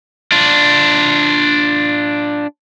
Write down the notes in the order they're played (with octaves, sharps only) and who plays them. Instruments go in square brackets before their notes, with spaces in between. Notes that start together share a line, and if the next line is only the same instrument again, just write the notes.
[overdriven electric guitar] D4 F4